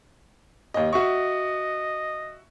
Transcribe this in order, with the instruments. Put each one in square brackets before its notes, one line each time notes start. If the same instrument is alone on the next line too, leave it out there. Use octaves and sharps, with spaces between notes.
[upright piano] D#2 D#5
[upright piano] F#4 E5 C#6 [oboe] D#5